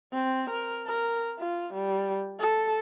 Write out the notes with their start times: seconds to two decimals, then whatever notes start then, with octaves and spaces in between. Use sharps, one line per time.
0.13 C4
0.50 A#4
0.87 A#4
1.39 F4
1.73 G3
2.39 A4